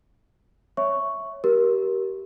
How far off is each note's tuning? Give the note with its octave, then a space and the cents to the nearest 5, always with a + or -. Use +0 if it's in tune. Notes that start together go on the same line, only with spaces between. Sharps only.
C#5 +0 E5 +0 C#6 +0
G4 -20 A#4 +20